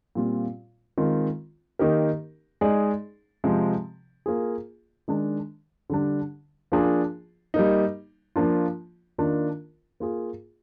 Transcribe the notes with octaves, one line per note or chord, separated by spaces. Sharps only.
A#2 G3 C4 F4
D#3 G#3 C4 F4
D#3 A#3 D#4 G4 A#4
G#3 D#4 G#4 D5
C3 F3 G#3 C4
A#3 F4 G#4
D#3 G#3 D4
D3 G3 D4
F3 A#3 D4 F4 G#4
G3 A#3 D#4
F3 A#3 D4 F4
D#3 A#3 D4 F4 A#4
A#3 F4 G#4